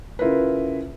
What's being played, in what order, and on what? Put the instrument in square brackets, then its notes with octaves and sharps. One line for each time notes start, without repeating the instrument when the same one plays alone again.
[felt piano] C#3 E4 F4 A#4 B4